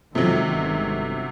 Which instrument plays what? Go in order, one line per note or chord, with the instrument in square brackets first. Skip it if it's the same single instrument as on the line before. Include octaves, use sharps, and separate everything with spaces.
[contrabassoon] F2 [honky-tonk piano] C3 F#3 [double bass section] D#3 G#3
[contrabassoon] G1